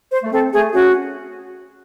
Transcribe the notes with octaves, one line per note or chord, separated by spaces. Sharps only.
C5
A3
C4 A4
A3 G#4
C#4 F#4